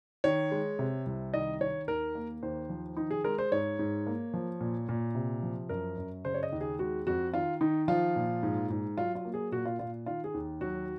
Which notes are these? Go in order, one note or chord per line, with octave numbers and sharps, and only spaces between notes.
D#3 C#5
G#3
C3
C2
D#3 D#5
D#3 C#5
D#2 A#4
A#3
D#2 C5
F3
D#3 D#4
G#4
G#3 A#4
C5
G#2 C#5
G#2
A#3
F3
A#2
A#2
C3
F3
F#2 A#4
F#2
C#3 C5
C#5
D#5
D#2
G#4
G#3 F#4
F2 F#4
D#3 F4
D#3 D#4
F3 F4
A#2
G#2
G#2
F#3 F4
F4
A#3
G#4
A#2 F#4
F4
A#2 F4
D#3 F4
G#4
D#2
F#3 F#4